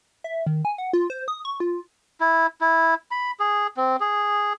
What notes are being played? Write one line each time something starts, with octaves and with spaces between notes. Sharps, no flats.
E5
D#3
G#5
F#5
F4
C5
D#6
C#6
F4
E4
E4
B5
G#4
C4
G#4